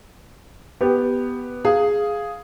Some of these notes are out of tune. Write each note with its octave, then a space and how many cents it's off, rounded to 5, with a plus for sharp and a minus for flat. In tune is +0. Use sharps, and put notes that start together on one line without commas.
B3 +0 G4 +0
G#4 +0 F5 +0